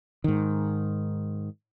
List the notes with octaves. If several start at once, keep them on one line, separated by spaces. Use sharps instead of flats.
G#2 D#3